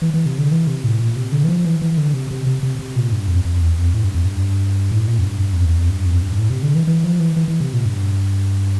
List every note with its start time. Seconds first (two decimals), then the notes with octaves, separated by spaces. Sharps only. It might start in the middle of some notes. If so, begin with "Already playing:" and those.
0.02 E3
0.14 E3
0.26 C3
0.38 D3
0.51 E3
0.67 C3
0.84 A2
1.00 A#2
1.16 C3
1.32 D3
1.44 E3
1.49 F3
1.65 E3
1.82 E3
1.97 D3
2.14 C3
2.31 C3
2.47 C3
2.63 C3
2.79 C3
2.96 A#2
3.12 G2
3.28 F2
3.45 F2
3.61 E2
3.77 F2
3.94 A2
4.04 G2
4.15 F2
4.25 G2
4.91 A2
5.08 A#2
5.19 F2
5.24 G2
5.40 G2
5.53 F2
5.65 E2
5.78 F2
5.89 G2
6.06 F2
6.22 G2
6.32 G2
6.38 A2
6.50 C3
6.63 D3
6.75 E3
6.87 E3
7.04 F3
7.20 E3
7.36 E3
7.48 E3
7.60 C3
7.73 A#2
7.85 G2